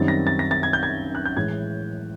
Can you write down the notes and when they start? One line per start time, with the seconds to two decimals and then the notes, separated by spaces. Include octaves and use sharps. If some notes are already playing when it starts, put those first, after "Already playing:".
Already playing: F#2 D#3 G3 C4 D#4 A6
0.08 A#6
0.27 A6
0.39 A#6
0.51 A6
0.63 G#6
0.73 G6
0.83 G#6
1.15 F#6
1.26 G6
1.37 A2 E3 G#3 G#6